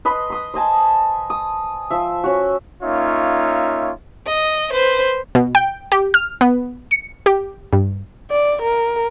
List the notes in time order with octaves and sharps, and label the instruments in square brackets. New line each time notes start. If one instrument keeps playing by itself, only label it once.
[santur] B4 D#5 B5 C6
C6 D#6
C5 D#5 G#5 A5
D#6
F3 E5
C#4 F#4
[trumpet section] A#3 C#4 D#4 F4 C#5 E5
[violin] D#5
B4 C5
[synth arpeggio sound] B2
G5
G4
F6
B3
C#7
G4
G2
[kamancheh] D5
A#4